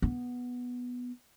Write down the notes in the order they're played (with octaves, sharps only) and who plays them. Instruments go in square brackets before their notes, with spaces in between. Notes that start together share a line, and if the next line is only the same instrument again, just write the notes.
[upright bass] B3